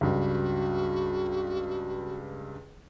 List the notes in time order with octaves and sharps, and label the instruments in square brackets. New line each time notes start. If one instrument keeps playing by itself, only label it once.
[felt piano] C#2 G2 [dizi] F#4